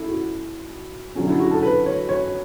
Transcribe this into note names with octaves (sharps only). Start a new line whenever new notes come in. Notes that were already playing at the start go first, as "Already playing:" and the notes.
Already playing: E4 A4
F#4
D3 F#3 C#4
E4
F#4
A4
B4
C#5
C#5